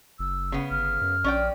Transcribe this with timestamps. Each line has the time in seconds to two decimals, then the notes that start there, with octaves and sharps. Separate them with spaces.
0.19 F#1 E6
0.52 C#3 B3
0.71 G1 F6
1.01 F#2
1.24 A#1 C#4 D5 G5